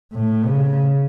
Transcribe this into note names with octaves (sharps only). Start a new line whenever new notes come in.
A2
C#3